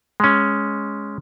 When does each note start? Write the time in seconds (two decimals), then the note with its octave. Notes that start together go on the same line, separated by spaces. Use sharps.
0.20 G#3 C#4